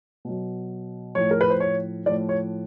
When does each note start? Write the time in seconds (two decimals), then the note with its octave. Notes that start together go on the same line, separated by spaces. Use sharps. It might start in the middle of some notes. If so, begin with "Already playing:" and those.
0.25 B2 F#3
1.15 A2 F3 C#5
1.31 A#4
1.41 B4
1.50 C5
1.60 C#5
2.06 A2 F3 D5
2.29 C#5